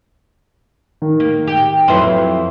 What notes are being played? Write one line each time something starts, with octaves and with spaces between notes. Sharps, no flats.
D#3
A#3
G4
F2 F#3 E4 B4 C5 C6